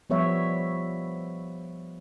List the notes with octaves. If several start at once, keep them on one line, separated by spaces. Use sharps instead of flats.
F3 G3 B3 C#5 E5